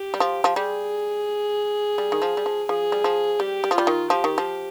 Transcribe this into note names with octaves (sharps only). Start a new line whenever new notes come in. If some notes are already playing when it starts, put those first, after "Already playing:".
Already playing: G4
G3
F3
F3
G3 G#4
G3
D#3
F3
G3
F3
F3 G#4
G3
F3
G3 G4
G3
F3
G3 F4
D#3
F3 G4
D#3
F3